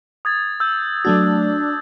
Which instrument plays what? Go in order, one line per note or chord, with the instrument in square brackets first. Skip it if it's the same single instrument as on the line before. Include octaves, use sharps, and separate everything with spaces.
[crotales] D#6 G#6 A6
E6 G6
[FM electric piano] F#3 A3 F#4 [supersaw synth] D4 [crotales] A6